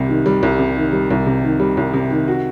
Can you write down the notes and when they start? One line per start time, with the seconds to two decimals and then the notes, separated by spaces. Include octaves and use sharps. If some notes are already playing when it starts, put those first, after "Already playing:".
Already playing: C2 C3 G3
0.09 D#3
0.26 G3
0.43 C2
0.59 C3
0.77 D#3
0.93 G3
1.11 C2
1.26 C3
1.44 D#3
1.60 G3
1.77 C2
1.93 C3
2.10 D#3
2.28 F#4